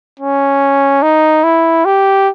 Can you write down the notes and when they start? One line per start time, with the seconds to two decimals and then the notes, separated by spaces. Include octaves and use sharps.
0.20 C#4
1.02 D#4
1.44 E4
1.85 G4